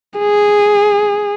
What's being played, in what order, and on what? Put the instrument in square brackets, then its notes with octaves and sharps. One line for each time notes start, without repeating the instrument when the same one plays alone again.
[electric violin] G#4